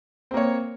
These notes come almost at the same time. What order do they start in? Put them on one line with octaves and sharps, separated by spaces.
C4 A#3 C#5